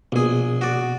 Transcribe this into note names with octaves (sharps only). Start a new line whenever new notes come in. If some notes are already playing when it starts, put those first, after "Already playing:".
A#1 B2 G#4
F#4 D5